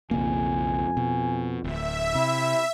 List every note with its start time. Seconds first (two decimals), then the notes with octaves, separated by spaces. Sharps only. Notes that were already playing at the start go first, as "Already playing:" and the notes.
0.11 B1 F2 C#3 A#3 G#5
0.97 B2
1.64 D1 E5
2.15 C3 E4